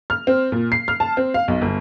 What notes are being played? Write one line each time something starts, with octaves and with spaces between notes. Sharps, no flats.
F6
C4
A#2
C7
F6
A5
C4
F5
B1
G1